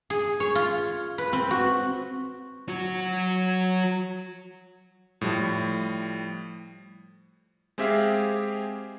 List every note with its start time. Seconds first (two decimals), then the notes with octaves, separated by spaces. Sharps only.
0.10 G#4
0.40 C#5
0.55 F4
1.18 B4
1.33 C4
1.51 F#4
2.69 F#3 F#4
5.21 A2 F3 G3
7.78 G#3 C4 G4 G#4 E5 F5